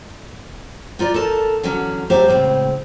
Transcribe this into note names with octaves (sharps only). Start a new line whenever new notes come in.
D#4 F4 B4 D5
A4 A#4 A5
D3 E3 F#3 C#4
F#3 A3 G4 C5 E5 F5
A2 C#3 G#3 C4